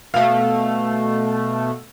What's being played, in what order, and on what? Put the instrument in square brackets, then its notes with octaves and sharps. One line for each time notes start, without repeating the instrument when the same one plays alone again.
[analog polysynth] B2 A3 [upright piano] F5